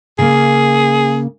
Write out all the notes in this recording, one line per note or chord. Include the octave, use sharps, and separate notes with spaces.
C#3 A#3 G#4